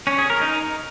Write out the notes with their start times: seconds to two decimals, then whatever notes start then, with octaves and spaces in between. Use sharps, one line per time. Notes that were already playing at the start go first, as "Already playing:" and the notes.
0.07 C#4
0.18 G#4
0.30 A#4
0.41 D#4